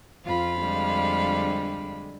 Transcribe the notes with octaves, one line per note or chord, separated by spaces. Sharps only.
F2 F4 F5 B5
D3 G3 G#3